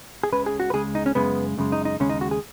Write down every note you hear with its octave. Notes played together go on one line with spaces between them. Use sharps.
G#4
C#2 C#3 G#3 B4
G#4
F#4
B4
C#2 C#3 G#3 G#4
D#4
C#4
F#2 C#3 G#3 B3
F#2 C#3 G#3
D#4
D#4
D#2 C#3 G#3 C#4
D#4
F#4
G#4